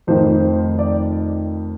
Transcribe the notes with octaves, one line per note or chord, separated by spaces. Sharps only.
F1 F2 D#3 C5
D5